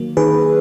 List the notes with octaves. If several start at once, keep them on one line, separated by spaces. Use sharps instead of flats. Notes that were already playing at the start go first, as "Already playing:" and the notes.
Already playing: D#3 F#3 A#3
D#3 G#4 B4